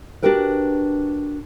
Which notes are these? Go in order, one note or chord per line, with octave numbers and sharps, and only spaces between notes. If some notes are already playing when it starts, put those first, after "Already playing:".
D4 D#4 F#4 G4 A#4 B4